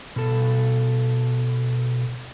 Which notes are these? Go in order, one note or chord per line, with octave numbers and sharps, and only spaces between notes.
B2 A4